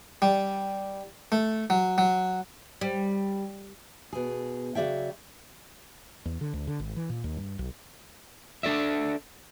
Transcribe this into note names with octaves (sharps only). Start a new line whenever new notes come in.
G3
A3
F#3
F#3
G3
B2 G#4
C#3 F#3 C#4 D5 E5 G5
E2
D3
D2
D3
G#1
E3
A#2
D#2
G2
B1
D4 A4 D5 E5